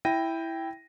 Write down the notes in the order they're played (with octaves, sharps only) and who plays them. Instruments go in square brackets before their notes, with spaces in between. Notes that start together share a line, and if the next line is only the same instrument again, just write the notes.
[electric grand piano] E4 G5 A#6 D#7